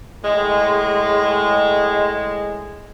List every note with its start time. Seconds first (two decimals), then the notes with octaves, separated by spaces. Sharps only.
0.23 A2 G#3